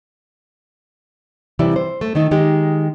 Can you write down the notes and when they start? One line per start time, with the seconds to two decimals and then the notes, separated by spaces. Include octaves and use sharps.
1.59 C3 E3 G3 E4
1.76 C5
2.01 A3
2.15 D#3 A3 D#4
2.31 D#3 G#3 D#4 G4